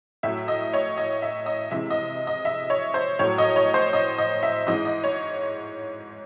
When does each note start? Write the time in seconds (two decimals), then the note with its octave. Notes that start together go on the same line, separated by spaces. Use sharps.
0.23 A2 F#3 E5
0.48 D#5
0.73 C#5
0.98 D#5
1.22 E5
1.46 D#5
1.71 C3 E3 G#3 E5
1.90 D#5
2.27 D#5
2.45 E5
2.70 C#5
2.94 C5
3.19 A2 F#3 C#5
3.38 D#5
3.56 C#5
3.74 C5
3.93 D#5
4.18 D#5
4.43 E5
4.67 G#2 E3 G#3 D#5
4.85 D#5
5.04 C#5